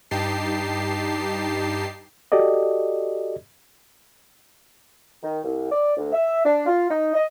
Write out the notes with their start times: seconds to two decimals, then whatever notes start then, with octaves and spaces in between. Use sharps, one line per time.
0.11 G2 D#4 G4 A5 C7
2.32 F#4 G4 A4 D5 D#5
5.23 D#3
5.44 C2
5.70 D5
5.97 D2
6.13 E5
6.44 D4
6.66 F4
6.88 D#4
7.14 D#5